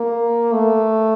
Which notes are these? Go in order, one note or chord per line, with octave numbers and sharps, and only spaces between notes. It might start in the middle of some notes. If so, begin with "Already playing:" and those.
Already playing: A#3
A3